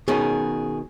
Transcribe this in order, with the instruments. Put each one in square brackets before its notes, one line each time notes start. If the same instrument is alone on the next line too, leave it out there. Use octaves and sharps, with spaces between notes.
[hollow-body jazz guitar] B2 D#3 C#4 [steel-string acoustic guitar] G#4